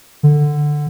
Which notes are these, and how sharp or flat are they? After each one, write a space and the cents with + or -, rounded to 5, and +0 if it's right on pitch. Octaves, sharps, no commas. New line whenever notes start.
D3 +10